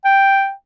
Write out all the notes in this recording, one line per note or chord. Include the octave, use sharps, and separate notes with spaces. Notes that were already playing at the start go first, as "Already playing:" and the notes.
G5